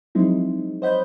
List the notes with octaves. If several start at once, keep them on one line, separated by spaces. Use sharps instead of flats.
F3 F#3 G#3 C4 D#4 E4
C5 C#5 D#5 F#5 B5 G6